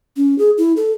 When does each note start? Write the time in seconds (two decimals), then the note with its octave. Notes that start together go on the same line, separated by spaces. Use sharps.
0.16 C#4
0.38 G#4
0.58 E4
0.77 A4